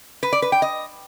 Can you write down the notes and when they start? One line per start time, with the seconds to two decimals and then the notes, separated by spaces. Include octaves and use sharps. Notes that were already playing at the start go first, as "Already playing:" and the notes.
0.23 B4
0.33 D5
0.42 B4
0.52 G5
0.62 D#5